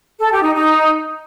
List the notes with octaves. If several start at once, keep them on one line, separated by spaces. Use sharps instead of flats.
A4
G4
D#4
D#4